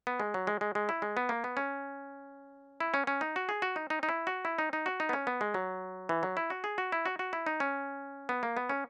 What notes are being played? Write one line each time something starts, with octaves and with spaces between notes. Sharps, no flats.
B3
G#3
F#3
G#3
G#3
G#3
E4
G#3
B3
A#3
B3
C#4
E4
C#4
C#4
D#4
F#4
G#4
F#4
D#4
D#4
D#4
E4
F#4
E4
D#4
D#4
F#4
D#4
B3
C#4
B3
G#3
F#3
E3
F#3
E4
F#4
G#4
F#4
E4
F#4
F#4
E4
D#4
C#4
B3
A#3
B3
C#4